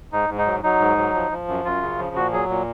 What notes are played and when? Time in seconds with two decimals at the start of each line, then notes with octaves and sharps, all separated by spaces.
0.12 G#2 D#4
0.30 G#2
0.38 D#4
0.46 F#3
0.63 F#3 D#4
0.80 G#2
0.97 F#3
1.15 F3
1.31 F3
1.48 F#2
1.65 F#2 F4
1.82 C#3
1.99 F3
2.16 A#2 F#4
2.33 F#3 G#4
2.50 A#2